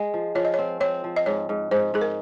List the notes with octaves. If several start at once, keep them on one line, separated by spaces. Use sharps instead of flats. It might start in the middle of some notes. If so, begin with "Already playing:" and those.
Already playing: G#3 D#5
F3
F3 C#5
D#5
C4 C#5
C4 C#5
F3
D#5
G#2 C#5
G#2
G#2 C5
G#2 G#4
A#4